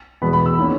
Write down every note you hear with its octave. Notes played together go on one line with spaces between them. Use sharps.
E2 B2 G#3 B3 B5
B5
E6
D#3 A#3 C#4